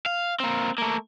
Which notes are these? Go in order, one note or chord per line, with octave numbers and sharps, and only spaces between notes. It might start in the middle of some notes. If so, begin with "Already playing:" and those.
F5
A#3 C4
A3 A#3